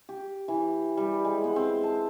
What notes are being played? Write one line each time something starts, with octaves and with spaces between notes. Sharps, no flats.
G4
E3
G3
G#3
B3
C4
A5